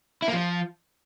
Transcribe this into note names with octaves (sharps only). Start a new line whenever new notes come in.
E4
A#3
F3